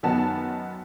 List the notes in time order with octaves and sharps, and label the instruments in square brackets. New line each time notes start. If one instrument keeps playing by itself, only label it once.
[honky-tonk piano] F#2 D#3 B3 F#4 A5